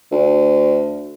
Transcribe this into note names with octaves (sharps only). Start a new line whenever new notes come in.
D2